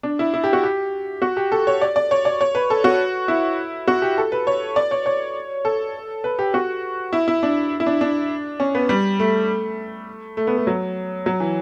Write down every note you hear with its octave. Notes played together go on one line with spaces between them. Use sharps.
D4
E4
E4
G4
F#4
G4
F#4
G4
A4
C#5
D5
D5
C#5
D5
C#5
B4
A4
F#4
E4
F#4
G4
A4
B4
C#5
D5
C#5
C#5
A4
B4
G4
F#4
E4
E4
D4
E4
D4
D4
C#4
B3
G3
A3
A3
B3
A3
F#3
F#3
E3